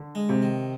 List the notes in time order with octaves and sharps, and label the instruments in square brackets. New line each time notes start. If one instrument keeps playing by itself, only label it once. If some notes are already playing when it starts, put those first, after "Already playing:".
Already playing: [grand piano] D3
[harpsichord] G#3
[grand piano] C3
[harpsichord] D#3